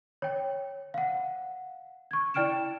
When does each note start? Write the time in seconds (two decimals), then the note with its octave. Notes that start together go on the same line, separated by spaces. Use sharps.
0.22 C#5 G5
0.94 F5 F#5
2.11 C#6 G#6
2.34 E4 D5 G5 F6 D7 E7